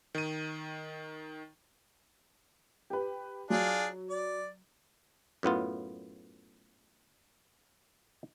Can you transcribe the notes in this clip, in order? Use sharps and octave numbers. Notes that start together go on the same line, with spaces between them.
D#3 D#7
G4 B4
F#3 D4 F4 G#4
D5
F#2 A2 B3 F4